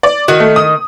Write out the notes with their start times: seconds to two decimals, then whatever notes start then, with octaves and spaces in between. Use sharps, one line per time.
0.03 D5
0.28 D#3 F#4
0.40 A3
0.56 D#6